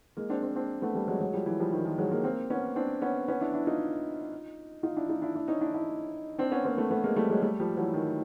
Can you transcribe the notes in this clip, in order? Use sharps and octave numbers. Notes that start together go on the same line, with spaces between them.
G#3 A#3
C4 D4
C4 D4
C4 D4
A3 B3
G3 A3
F#3 G#3
F#3 G#3
F3 G3
E3 F#3
F3 G3
D#3 F3
D#3 F3
F#3 G#3
G#3 A#3
A#3 C4
B3 C#4
C4 D4
B3 C#4
B3 C#4
D4 E4
D4 E4
D#4 F4
D#4 F4
D4 E4
D#4 F4
D4 E4
D4 E4
C#4 D#4
D4 E4
D4 E4
C4 D4
B3 C#4
A#3 C4
A3 B3
A3 B3
G#3 A#3
G3 A3
F#3 G#3
G3 A3
F3 G3
E3 F#3
D#3